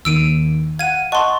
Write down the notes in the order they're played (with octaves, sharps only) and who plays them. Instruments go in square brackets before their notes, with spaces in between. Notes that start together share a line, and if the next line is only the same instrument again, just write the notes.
[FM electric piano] D#2 D#3 A#3 [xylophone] E6 D7 D#7
[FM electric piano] F5 F#5 [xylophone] G#6 D#7
[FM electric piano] D#5 F#5 A5 [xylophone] C6 C#6